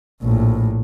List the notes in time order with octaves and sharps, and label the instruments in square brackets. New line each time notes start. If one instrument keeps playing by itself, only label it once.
[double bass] A#1 A2